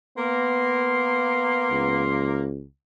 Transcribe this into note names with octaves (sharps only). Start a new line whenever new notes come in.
A#3 B3 C6
C#2